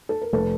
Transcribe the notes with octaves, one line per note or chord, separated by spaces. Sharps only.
A4
A#4
F1 A4 B4